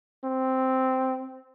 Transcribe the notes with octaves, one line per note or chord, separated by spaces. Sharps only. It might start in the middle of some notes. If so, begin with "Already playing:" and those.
C4